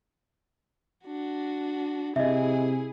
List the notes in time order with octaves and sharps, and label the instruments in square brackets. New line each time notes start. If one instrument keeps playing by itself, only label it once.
[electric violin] D4 F#4
[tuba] C3 [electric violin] E4 G#4 [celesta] D#5 E5